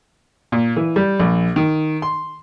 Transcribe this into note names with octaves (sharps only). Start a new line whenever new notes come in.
A#2
E3
G3
A#1
D#3
C6